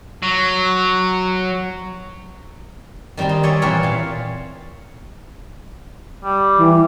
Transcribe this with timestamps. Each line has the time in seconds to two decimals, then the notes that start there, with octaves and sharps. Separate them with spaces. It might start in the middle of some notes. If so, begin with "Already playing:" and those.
0.23 F#3
3.17 D#3 G3 C4 A#5 C6
3.29 D#4
3.43 C#5 D5 E5 G#5 A#5 C6
3.62 A#2 E3 C4 F4 A#4 C#5
3.83 A#2 F5
6.24 G3
6.57 E3